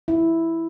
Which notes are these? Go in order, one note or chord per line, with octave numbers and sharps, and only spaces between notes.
E4